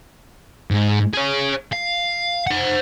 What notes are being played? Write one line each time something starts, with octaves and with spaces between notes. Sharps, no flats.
G#2
G#4 C#5
F5
C5 F#5